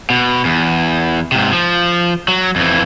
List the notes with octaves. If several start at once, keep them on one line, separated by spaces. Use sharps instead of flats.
B2
E2
G#2 C3
F3
F#3
F2 E3